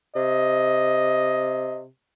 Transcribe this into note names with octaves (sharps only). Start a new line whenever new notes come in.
C3 D#5